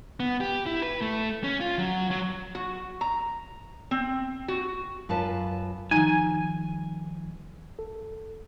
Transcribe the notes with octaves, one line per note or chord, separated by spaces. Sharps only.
B3
G4
E4
B4
A3
C#4
F4
F#3
F#3
F#4
A#5
C4
F#4
F#2 F4 B4 A5
D#3 F3 G3 D#4 G#5
A4